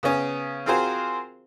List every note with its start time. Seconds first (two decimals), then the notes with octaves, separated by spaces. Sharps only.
0.03 C#3 B3 C#4
0.66 C4 F4 F#4 G#4 A#4 C5